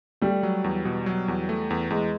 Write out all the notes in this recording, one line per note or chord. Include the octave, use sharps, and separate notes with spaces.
G3 A3
F#3
E2
B2
F#3
E2
A3
E2
E2 G#3